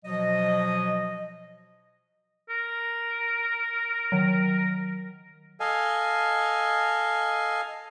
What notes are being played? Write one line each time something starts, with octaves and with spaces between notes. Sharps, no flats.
B2 F3 F#3 D#5
A#4
D#3 F#3
A4 D#5 F5 G#5